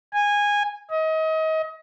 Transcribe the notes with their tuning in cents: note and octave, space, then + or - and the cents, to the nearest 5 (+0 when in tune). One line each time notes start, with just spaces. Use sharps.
G#5 -15
D#5 +30